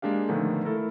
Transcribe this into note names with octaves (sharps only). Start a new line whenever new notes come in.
G#3 A#3 D4 G4 F5
A#2 D3 D#3 F3 A3 B3
A3 E4 A4 A#4